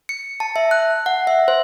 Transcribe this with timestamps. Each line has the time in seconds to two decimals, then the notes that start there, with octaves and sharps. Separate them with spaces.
0.09 C#7
0.40 A5
0.56 E5
0.71 F#6
1.06 F#5
1.27 E5
1.48 C5